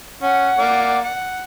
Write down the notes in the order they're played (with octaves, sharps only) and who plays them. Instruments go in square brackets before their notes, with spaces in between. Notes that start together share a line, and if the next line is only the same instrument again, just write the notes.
[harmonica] C#4 [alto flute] F#5
[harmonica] A#3 D5
F#5